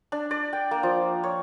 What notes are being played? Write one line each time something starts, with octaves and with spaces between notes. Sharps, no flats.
D4
D5
G5
A#3
F3
C#5